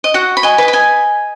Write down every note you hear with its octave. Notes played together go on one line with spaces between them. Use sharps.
D#5
F#4 F#5
B5
D#5 G#5
B4 D#5
B5
D#5 G#5